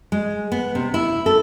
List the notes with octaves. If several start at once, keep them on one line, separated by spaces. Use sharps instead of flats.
G#3
B3
C3
E4
A4